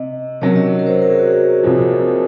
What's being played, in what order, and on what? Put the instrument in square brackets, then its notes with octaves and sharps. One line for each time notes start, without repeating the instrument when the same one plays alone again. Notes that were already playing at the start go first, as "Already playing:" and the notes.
Already playing: [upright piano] C3 [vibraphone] D#5
[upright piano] C3 D#3 F#3 C#4 [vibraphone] C#5
[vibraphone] D#5
A#4
C5
A#4
G#4
F#4
G#4
[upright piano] C2 A#2 F3